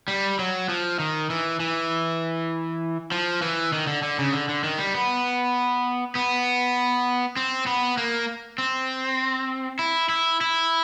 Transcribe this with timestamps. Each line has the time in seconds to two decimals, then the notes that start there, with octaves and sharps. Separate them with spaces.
0.08 G3
0.39 F#3
0.69 F3
0.99 D#3
1.30 E3
1.60 E3
3.12 F3
3.42 E3
3.73 D#3
3.87 D3
4.03 D3
4.18 C#3
4.33 D3
4.49 D3
4.64 D#3
4.78 G3
4.94 B3
6.15 B3
7.37 C4
7.66 B3
7.97 A#3
8.58 C4
9.79 E4
10.09 E4
10.41 E4